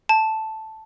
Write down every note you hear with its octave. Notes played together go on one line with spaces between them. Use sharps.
A5